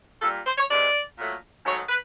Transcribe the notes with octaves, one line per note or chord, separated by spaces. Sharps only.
A#2 G3 A4
C5
C#5
C3 E3 G#3 D5
A#2 F#3 A3
G#2 D#3 F#3 A3 C#5
B4